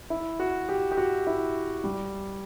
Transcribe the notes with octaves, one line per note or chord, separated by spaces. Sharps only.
E4
F#4
G4
G4
F#4
E4
G3